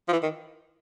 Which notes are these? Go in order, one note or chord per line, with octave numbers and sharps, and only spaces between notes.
F3
E3
D#3